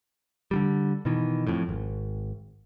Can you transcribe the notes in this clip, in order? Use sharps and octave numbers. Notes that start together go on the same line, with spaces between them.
D3 D#3 G3
B2 D#3 E3
F2 A2
G#1